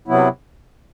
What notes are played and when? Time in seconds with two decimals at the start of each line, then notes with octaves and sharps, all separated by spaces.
0.08 C3 F#3 B3 E4